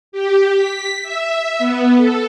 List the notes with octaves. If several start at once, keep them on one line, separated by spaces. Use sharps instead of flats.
G4
B6
E5
B3
A4